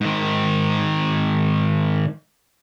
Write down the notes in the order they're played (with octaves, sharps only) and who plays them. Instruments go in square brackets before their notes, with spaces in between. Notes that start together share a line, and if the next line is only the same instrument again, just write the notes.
[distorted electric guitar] G#2 D#3